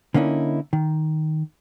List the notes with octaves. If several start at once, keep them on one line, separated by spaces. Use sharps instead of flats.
D3 A#3 C#4 D#4 E4
D#3